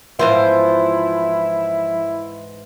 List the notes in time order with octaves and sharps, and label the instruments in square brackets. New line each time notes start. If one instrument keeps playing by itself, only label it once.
[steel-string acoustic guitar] G#2 E3 C5 [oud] F3 B3 F4 [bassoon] E4